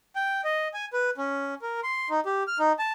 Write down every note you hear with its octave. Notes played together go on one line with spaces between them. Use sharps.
G5
D#5
G#5
B4
C#4
A#4
C6
D#4
G4
F6
D#4
A5